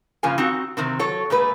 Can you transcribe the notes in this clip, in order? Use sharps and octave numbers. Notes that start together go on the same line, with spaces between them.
G2 C#3 F3 A#3 G#5
C4 D#4 F#4
C3 D#3 C4
F#3 A4 C#5
A#2 G#3 A3 B4